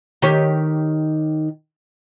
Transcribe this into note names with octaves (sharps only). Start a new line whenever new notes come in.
D#3 G4 C#5